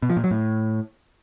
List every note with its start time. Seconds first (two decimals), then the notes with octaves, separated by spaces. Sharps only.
0.02 B2
0.10 F3
0.17 A#2
0.24 F#3
0.31 A2